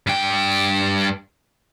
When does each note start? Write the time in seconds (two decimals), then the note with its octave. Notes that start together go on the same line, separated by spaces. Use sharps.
0.07 G2 G5